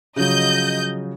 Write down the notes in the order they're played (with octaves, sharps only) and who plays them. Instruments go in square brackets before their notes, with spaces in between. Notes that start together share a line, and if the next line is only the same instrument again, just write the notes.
[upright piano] C#3 F3 F#3 [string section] D#5 G6